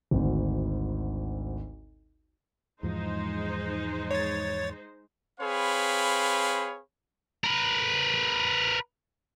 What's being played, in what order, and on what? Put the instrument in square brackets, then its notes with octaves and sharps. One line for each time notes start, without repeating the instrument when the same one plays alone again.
[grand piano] G#1 D2
[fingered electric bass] E2 G#2 F3 [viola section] G#3 D#4 C5
[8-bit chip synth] C#5 A6
[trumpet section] C4 G#4 B4 C#5 F5 B5
[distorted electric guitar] A#4 B4